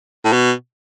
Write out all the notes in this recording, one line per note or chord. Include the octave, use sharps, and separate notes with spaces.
A2
B2